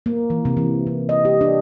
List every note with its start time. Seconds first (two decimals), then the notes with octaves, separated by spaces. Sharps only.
0.06 A#3
0.30 E3
0.45 C3
0.57 E3
0.87 C3
1.09 D#5
1.25 G4
1.41 D4